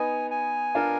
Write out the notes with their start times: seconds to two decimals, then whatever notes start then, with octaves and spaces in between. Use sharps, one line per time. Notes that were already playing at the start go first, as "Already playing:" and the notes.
Already playing: B3 D#4 G#5
0.31 G#5
0.75 D4 F4 A#4